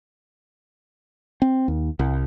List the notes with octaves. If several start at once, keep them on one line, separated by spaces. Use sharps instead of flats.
C4
D#2
C2